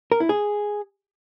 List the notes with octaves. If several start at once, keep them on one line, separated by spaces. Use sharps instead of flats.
A#4
E4
G#4